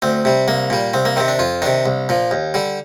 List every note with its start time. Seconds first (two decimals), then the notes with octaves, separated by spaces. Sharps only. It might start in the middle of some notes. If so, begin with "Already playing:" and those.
0.02 D2 C4
0.25 C3 G3
0.48 C2 A#3
0.70 A#2 G3
0.94 C2 C4
1.05 A#3
1.16 C3 D#3 C4
1.28 D4
1.39 F2 F4
1.62 C3 D#3 D4
1.86 C2
2.09 A#2 F3
2.31 D#2
2.54 D3 G3